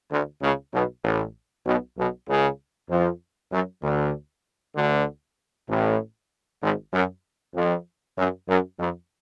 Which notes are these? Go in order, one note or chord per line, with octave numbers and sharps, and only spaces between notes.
D2 D3
C#2 C#3
B1 B2
A1 A2
B1 B2
B1 B2
C#2 C#3
F2 F3
F#2 F#3
D2 D3
D2 D3
A1 A2
G#1 G#2
F#2
F2
F#2
F#2
F2